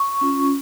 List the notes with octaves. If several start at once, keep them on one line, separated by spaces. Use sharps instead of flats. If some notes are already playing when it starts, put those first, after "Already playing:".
Already playing: C#6
C#4 F4